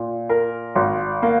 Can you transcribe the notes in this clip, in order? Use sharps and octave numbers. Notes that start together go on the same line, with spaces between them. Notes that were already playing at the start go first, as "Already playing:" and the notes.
Already playing: A#2
A#4
G#1
A#3